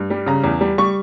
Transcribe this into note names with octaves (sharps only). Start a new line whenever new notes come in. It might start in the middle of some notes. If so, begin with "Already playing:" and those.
Already playing: G2
G3
C#3 A#5
E2
G3
G3 C#6